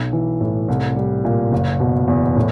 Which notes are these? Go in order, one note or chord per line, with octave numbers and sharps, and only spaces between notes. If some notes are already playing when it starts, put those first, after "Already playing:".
Already playing: B1
E3
A2
C2
G3
A#2
F#1
B2
E2
A2